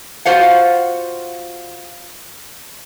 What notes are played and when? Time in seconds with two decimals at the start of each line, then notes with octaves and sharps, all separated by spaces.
0.25 F4 F#4 C5 F5 F#5